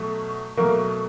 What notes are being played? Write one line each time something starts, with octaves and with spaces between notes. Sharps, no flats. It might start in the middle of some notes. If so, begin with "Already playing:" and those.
Already playing: B2 F#3 A3
B2 F#3 A3 A#3 A#4